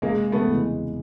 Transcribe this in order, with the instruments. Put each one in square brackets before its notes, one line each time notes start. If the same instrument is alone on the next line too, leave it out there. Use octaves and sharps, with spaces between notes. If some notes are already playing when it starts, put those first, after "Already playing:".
[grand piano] F1 [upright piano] G#3 A#3
[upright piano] A3 B3
[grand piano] E2 C#3 E3 G#3